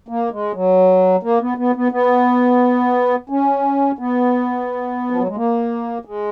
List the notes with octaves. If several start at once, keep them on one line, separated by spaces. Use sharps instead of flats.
A#3
G#3
F#3
A#3
B3
B3
B3
B3
C#4
B3
F3
F#3
G#3
A#3
G#3